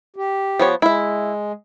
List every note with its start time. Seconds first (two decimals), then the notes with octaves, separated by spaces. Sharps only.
0.16 G4
0.59 F3 B3 C#5
0.82 G#3 E4 E5